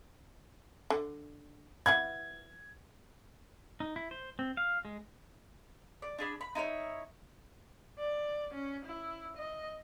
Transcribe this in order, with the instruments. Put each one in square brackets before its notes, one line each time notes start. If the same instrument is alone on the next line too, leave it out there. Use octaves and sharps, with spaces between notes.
[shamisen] D3
[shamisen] E3 F#5 B5 [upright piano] G#6
[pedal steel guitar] D#4
E4
C5
C4
F5
G#3
[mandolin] D5
D4 G#4 B5
B5
D#4 E4 B4 C#5
[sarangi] D5
C#4
E4
D#5